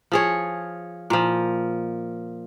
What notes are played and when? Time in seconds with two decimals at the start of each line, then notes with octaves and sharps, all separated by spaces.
0.12 F3 G#4 C#5
1.10 A#2 F3